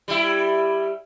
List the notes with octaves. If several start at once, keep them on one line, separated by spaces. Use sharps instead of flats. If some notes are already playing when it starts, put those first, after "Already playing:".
G3 E4